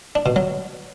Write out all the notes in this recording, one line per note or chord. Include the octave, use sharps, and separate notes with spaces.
D4
B2
F#3